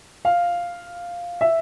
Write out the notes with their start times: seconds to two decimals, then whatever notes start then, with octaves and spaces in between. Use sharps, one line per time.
0.25 F5
1.41 E5